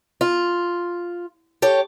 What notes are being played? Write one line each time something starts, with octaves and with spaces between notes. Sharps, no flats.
F4
G4 A4 C#5